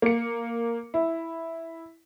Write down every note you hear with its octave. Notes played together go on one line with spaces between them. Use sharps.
A#3 C#7
E4